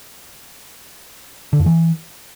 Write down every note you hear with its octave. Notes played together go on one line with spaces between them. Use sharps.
D3
F2
E3